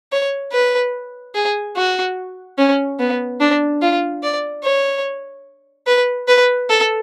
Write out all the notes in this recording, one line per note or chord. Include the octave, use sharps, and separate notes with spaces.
C#5
B4
G#4
F#4
C#4
B3
D4
F4
D5
C#5
B4
B4
A4